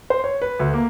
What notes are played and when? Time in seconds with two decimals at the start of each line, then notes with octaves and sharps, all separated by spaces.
0.10 C5
0.24 C#5
0.42 B4
0.59 D2
0.74 A#3